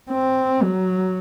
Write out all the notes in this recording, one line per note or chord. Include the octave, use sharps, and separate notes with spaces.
C4
F#3